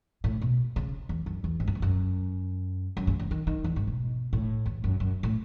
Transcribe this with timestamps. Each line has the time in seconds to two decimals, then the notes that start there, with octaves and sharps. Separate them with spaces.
0.24 A2
0.41 B2
0.76 C#3
1.09 E2
1.26 F#2
1.44 E2
1.60 G#2
1.68 F#2
1.75 E2
1.82 F#2
2.97 F#2
3.07 C#3
3.20 E3
3.31 D#3
3.47 D#3
3.64 E2
3.76 G#2
3.87 B2
4.33 A2
4.66 E2
4.84 F#2
5.00 F#2
5.23 A2